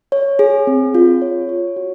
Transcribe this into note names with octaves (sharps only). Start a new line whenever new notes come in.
C#5
G#4
C4
F4
C#5
C#5
F#4